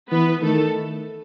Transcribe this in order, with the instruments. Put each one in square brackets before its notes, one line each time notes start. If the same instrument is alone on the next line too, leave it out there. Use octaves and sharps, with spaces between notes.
[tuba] E3 [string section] B3 B4
[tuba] D#3 [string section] A3 A4